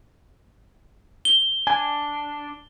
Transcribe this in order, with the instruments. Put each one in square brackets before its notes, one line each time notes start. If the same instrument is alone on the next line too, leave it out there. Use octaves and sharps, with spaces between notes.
[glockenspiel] G7
[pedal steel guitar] D4 [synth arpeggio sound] G#5